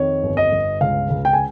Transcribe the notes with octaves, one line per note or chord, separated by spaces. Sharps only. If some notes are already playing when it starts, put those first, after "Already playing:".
Already playing: F2 D#3 C#5
G1
D#5
G1
C#2 F5
C#2
G5
G#5